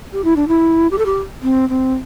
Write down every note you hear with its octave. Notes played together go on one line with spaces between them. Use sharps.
G4
E4
D4
E4
G4
A4
G4
C4
C4